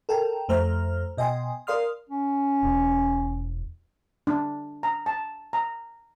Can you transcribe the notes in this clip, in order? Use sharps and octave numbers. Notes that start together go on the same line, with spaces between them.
A4 A#4 G5
F2 A3 C5 A#5 F6
B2 D#5 G5 G#5 C6
A#4 D5 F5 C6 D#6 F6
C#4
E1
D4
A#5
A5
A#5